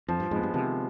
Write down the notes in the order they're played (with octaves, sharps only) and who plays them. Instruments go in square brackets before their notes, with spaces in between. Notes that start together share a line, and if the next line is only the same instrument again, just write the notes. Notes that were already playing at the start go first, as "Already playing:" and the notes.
[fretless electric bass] F2 [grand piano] F3
[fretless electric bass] G2
[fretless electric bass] F2 G#2 [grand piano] G#3 B3
[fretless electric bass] G2
[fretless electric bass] C3 D#3 [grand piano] F3